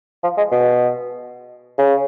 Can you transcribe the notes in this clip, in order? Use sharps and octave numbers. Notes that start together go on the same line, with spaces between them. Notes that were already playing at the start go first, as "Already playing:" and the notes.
F3
G#3
B2
C#3